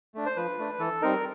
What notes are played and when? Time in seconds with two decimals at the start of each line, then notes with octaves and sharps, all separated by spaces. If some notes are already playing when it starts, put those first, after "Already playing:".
0.15 A3 D4
0.26 C5
0.36 F3 B4
0.59 A3 D4
0.79 E3 A4
1.02 G3 C4 D#4 A#4